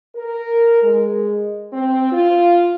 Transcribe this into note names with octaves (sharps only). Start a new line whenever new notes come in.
A#4
G#3
C4
F4